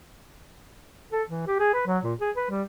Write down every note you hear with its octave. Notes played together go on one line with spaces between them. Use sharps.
A4
E3
G4
G#4
B4
F#3
A#2
G#4
B4
G3